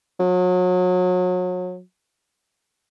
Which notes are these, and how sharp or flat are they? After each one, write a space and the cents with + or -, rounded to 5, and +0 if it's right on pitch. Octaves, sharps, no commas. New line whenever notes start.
F#3 -30